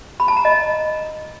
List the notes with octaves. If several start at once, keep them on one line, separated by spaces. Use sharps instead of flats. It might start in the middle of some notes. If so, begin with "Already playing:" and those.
B5
A5
A#5
D#5